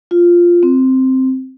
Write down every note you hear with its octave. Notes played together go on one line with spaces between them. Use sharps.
F4
C4